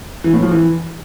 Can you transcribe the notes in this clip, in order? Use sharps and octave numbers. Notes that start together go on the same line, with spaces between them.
E3
A2
F3
E3